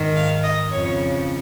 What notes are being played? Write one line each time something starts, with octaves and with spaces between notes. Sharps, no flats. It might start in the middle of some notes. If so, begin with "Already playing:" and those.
Already playing: G#2 D#3
F5
D#5
F2 C#3 C#5